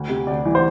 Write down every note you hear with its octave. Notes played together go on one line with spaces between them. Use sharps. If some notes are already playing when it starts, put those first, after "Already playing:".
Already playing: D2
C3
D2 D5
E3
C5